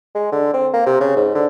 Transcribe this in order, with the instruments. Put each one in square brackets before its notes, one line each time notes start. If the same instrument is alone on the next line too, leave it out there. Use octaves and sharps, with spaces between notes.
[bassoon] G#3
D3
C4
A#3
C3
C#3
G#2
D3